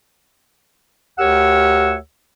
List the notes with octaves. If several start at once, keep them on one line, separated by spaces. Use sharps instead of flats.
D2 G4 A#4 C#5 F#5 E6